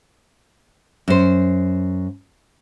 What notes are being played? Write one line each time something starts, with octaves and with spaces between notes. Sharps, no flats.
F#2 C5